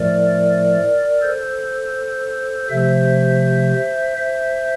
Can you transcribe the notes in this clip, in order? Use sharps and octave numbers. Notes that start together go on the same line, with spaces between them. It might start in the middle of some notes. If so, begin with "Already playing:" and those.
Already playing: A2 F3 A3 A#4 D5
A4 C5
C3 F3 A3 C5 E5
C5 E5